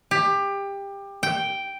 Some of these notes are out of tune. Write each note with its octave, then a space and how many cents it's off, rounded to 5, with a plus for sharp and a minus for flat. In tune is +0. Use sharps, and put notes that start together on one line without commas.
G4 +20
G5 -5